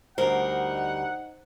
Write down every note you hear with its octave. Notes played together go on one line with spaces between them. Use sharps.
D2 G3 D#4 A#4 C5 F#5